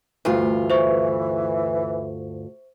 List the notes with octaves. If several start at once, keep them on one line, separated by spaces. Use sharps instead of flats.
D2 G2 E3 F4
C5 E5 C#6